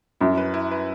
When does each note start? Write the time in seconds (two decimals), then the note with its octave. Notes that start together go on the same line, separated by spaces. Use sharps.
0.20 F#2 E4
0.38 B4
0.54 E4
0.71 B4